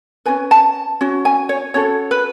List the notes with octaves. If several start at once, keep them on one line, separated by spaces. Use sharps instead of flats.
C#4 F#4 B4 G#5
A5
C#4 F#4
G#5
C#5
C#4 F#4 A4 C#5
B4